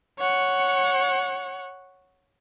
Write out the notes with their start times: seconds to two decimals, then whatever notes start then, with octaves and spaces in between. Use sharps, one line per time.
0.19 C#5 F#5